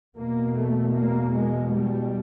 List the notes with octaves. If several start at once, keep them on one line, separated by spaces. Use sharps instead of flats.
E2 B2 A#3
A3
A#3
G#3
G3